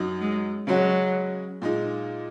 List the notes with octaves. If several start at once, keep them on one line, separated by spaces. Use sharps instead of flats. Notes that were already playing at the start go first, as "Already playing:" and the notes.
Already playing: F#2 F#3 D#4
G#3
C#3 F#3 G#3 F#4
A#2 G#3 D#4